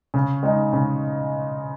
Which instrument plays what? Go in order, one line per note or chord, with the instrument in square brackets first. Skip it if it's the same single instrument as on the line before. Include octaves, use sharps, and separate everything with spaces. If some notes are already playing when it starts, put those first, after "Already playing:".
[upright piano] C#3
G#3 D#4
C#3